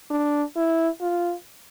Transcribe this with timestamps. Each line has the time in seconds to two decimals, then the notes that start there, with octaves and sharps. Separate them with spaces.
0.10 D4
0.56 E4
1.01 F4